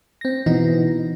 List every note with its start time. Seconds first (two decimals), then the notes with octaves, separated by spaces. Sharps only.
0.21 C4 A#6
0.46 B2 E3 D#4